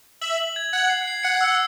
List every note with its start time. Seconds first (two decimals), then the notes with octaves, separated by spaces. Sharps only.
0.21 E5 F#7
0.38 F#7
0.56 G#6
0.73 F#5 G#6
0.89 C7
1.08 C7
1.23 F#5 C#7
1.41 E6